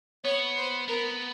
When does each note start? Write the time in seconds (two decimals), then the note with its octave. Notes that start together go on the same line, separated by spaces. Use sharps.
0.25 B3 C#5
0.57 C5
0.88 B3 A#4